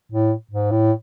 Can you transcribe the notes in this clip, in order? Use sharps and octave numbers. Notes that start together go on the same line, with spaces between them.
A2
G#2
A2